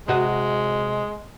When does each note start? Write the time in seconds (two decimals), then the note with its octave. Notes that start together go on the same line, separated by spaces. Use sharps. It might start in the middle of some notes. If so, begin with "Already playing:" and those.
0.08 C3 G#3 F#4 D#5